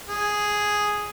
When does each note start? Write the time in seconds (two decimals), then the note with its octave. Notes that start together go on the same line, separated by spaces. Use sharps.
0.08 G#4